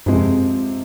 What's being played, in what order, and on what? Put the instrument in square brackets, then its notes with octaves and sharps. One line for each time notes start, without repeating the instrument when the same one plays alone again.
[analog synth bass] G2 [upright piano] C3 F3 G#3 C4
[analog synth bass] F#2